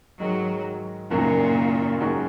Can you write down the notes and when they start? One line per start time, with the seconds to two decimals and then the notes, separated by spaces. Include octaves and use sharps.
0.20 G#2 D#3 F#3 G#3
1.10 F#1 F#2 A#2 D#3 F#3 A#3
2.00 F#2 D#3 G#3 C#4 F#4